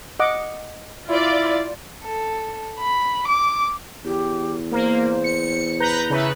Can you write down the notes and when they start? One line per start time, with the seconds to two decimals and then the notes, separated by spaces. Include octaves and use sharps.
0.20 D#5 F#5 D6
1.09 E4 F4 D5
2.03 A4
2.80 B5
3.28 D6
4.04 E2 G4
4.72 A#3 C5
5.24 C#7
5.80 B4 A#5 G6
6.10 C#3 E4 B4